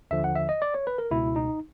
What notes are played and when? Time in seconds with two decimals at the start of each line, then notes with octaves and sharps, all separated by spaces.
0.11 D#2 D3 F3 E5
0.24 F#5
0.36 E5
0.49 D#5
0.62 D5
0.74 C#5
0.87 B4
0.98 A#4
1.11 C#2 B2 E4
1.36 D#4